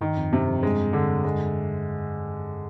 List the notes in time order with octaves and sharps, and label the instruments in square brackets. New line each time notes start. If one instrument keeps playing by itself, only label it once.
[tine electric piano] G2 [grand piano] D#3
[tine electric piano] F2
[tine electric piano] G2 [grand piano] C3
[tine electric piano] F2
[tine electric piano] G2 [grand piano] G#3
[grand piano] D3
G#3